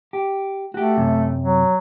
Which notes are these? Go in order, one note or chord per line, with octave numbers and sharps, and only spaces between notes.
G4
A3 F#4 G4
F#2 C3
F#3